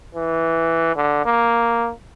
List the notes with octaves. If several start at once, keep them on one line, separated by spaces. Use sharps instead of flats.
E3
D3
A#3